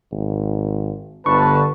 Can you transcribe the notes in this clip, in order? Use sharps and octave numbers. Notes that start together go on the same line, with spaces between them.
G#1
G1 D3 B4 A5 C#6